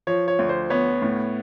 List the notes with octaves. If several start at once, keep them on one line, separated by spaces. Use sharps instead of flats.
F3 C#5
C#5
D2
C5
B3 C#5
A2